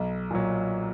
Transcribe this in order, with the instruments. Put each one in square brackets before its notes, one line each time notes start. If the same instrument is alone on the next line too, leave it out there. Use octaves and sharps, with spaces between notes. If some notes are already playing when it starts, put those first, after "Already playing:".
Already playing: [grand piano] B1
A#2 F#3